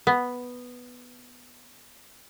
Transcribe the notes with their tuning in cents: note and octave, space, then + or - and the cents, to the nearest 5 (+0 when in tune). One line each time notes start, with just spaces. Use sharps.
B3 +0